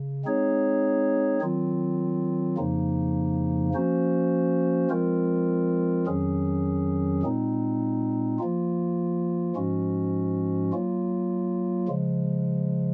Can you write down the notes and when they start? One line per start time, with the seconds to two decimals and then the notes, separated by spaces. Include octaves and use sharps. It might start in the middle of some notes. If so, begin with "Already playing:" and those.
Already playing: C#3
0.24 G#3 C4 D#4 G#4 C#5
1.41 D#3 F#3 C4 F4
2.57 F2 C#3 F3 A#3 D#4
3.73 F3 A#3 C#4 F#4 C5
4.90 F3 G#3 C4 F4 A#4
6.06 F2 D#3 F#3 C#4 G#4
7.23 A#2 G#3 C4 D#4
8.39 F3 A#3 F4
9.56 G#2 F3 G#3 C#4 F#4
10.72 F#3 A#3 F4
11.88 C#3 F3 G#3